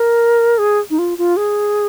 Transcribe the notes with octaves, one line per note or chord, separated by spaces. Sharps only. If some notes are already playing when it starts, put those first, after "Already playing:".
Already playing: A#4
G#4
D#4
F4
F4
G#4